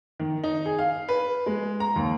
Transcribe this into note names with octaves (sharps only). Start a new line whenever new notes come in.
D#3
D#4
G#4
F5
B4
G#3
A#5
D#2